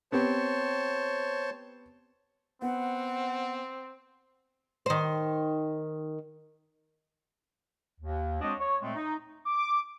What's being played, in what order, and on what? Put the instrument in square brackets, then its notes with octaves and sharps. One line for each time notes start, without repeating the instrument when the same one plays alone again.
[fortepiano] B3 C4 G4 [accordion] C5 C#5 A5
[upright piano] B3 [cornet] C4 [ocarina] F#5
[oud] D#3 C5
[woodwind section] D#2
G#3 C4 D4 F#4 C#5 D#5
C#5
A#2 G#3 A3 C4
D#4
[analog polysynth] D6